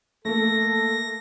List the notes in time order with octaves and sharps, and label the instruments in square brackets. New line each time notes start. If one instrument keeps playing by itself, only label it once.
[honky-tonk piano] A3 A#3 [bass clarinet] A4 [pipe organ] A#6